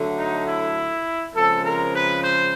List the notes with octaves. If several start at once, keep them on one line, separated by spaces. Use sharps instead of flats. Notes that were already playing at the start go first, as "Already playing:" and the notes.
Already playing: D3 F#3 A3
D#4
E4
C#3 F3 G#3 C4 A4
A#4
B4
C5